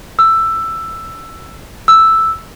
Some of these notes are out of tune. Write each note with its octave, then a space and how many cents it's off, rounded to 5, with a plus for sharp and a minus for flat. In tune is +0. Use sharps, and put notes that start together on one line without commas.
E6 +10
E6 +0